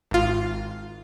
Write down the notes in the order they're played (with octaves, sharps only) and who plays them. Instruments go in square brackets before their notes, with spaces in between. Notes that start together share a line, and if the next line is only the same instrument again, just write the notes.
[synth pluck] G#1 F4